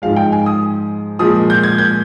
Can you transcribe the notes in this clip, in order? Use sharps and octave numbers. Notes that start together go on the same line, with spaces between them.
G#2 F3 G#3 F5
G5
G#5
D#6
A#2 F3 G#3 D#6
G6
G#6
G6